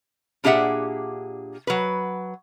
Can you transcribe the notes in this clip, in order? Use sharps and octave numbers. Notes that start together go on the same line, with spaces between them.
A#2 D4 G4 G#4 E5 F#5
F#3 B4